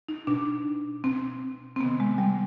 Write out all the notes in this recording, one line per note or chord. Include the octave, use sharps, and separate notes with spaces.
D#4
B2 D4
B2 C4
C4
C3 D#3 B3
G#3
G3